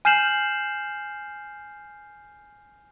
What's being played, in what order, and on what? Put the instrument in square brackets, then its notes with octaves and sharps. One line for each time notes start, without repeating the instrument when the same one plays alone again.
[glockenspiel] G#5 F6 G6 C7 E7 F#7